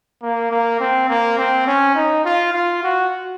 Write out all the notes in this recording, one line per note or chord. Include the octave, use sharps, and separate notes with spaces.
A#3
A#3
C4
A#3
C4
C#4
D#4
F4
F4
F#4